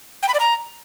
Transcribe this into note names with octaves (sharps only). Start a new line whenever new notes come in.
G5
B5
D5
A#5